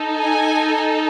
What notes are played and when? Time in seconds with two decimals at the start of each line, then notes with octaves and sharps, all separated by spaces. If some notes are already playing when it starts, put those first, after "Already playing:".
Already playing: D#4 A4
0.18 G#5